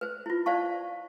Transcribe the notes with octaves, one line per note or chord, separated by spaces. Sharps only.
B4 C5
E4 F4
C5 D5 F5 A5 C#6